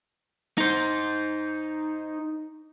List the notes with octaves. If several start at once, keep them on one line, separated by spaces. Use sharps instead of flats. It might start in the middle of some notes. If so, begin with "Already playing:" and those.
D#4 C5